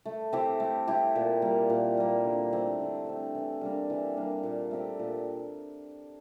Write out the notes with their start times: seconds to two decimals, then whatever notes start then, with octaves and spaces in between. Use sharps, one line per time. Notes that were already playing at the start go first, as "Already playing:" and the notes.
0.05 A3
0.33 C4 E4 G4
0.60 A3
0.88 C4 E4 G4
1.16 A#2
1.42 G3 A#3
1.70 A#2
1.97 G3 A#3
2.25 D3
2.53 A3 C4
2.80 D3
3.06 A3 C4
3.35 E3
3.61 G3 A#3 D4
3.90 E3
4.17 G3 A#3 D4
4.43 A#2
4.71 A3 C4 G4
4.99 A#2